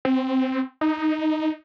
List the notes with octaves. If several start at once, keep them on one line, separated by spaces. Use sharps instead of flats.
C4
D#4